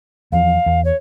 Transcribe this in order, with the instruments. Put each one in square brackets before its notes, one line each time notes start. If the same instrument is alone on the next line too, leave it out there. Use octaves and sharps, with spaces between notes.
[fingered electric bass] E2 F3 [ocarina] F5
[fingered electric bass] E2
[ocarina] C#5